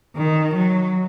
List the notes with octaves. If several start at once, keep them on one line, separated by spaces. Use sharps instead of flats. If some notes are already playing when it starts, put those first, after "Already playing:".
D#3
F#3